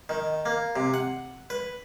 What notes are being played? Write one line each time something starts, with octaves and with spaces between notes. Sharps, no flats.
D#3
A#3
C3
F#5
B4